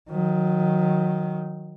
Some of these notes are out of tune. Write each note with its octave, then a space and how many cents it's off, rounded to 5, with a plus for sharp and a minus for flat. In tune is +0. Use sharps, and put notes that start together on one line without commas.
D#3 +0 F#3 -25